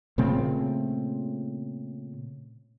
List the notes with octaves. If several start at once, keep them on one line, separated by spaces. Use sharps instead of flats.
A#2 C#3 A3 C4